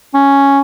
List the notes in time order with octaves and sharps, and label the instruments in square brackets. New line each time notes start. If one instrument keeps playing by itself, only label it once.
[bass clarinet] C#4